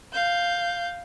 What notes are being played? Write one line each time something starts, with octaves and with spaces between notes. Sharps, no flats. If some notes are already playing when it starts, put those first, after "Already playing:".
F5 G6